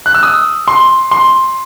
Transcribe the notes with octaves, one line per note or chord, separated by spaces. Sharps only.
F#6
E6
D#6
C6
C6